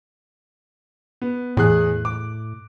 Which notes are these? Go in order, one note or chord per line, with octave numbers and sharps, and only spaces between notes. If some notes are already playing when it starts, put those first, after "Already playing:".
B3
E2 A2 G#4 F#6
D6